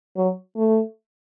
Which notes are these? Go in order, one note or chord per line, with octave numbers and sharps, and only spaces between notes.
F#3
A3